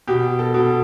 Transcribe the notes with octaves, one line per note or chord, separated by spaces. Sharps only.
B2 G4
A4
B2